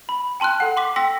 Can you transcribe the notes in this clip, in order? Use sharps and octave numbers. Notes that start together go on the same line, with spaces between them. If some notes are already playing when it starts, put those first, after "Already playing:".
B5
G5 A5 C6 F6 F#6
A4 F#5
C6 D6 B6
G5 C6 E6 A#6 B6